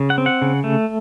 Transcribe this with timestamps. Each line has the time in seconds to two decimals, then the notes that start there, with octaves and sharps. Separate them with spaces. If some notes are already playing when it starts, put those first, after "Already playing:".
Already playing: C#3
0.10 F#5
0.18 C4
0.26 F#5
0.42 C#3
0.64 A3